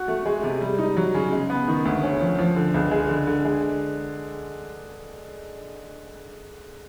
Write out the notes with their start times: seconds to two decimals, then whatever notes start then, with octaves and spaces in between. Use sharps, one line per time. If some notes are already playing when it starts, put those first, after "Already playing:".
Already playing: F#4
0.08 A3
0.25 G#3
0.43 C3
0.61 G3
0.79 D#4
0.97 F#3
1.14 C#3
1.33 G#3
1.50 B3
1.68 D#3
1.85 D2
2.03 C#4
2.21 F3
2.39 F3
2.56 D3
2.74 C#2
2.91 G#3
3.09 D3
3.27 D3
3.45 G#3